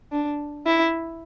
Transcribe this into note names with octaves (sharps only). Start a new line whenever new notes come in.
D4
E4